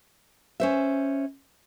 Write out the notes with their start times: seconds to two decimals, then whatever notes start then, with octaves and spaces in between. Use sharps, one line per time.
0.60 C#4 C5 E5